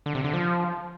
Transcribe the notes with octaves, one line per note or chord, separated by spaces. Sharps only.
D3
C3
D3
F3